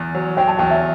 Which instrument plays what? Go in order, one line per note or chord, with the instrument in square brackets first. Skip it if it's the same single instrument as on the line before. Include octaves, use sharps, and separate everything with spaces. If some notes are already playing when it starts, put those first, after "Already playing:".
Already playing: [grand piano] E2
F#3
[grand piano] F#3 [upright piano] G5
[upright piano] A5
[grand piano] E2 [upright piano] G5
[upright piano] E5